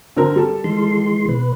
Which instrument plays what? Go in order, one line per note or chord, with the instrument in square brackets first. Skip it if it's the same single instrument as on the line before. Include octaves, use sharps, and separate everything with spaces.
[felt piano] D3 C4 A#4
G3 A4
[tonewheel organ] E3 G#3 C6
B2 B4